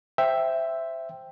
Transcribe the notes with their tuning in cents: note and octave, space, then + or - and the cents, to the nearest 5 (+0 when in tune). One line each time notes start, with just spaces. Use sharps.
C5 +0 E5 +5 G5 +0